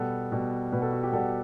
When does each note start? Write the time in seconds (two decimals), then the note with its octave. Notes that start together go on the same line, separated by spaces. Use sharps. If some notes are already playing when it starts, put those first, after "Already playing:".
Already playing: B2 G3 B3 A4
0.32 B2 G3 B3
0.72 B2 G3 B3 B4
0.82 A4
0.93 F#4
1.03 G4
1.12 B2 G3 B3 A4